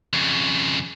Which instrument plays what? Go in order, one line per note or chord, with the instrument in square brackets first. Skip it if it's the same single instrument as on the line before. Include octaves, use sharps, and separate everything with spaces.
[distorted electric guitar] F2 C#3